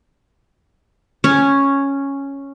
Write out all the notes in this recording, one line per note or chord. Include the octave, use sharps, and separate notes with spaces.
C#4